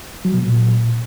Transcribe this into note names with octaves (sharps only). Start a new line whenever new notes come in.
F#3
B2
A#2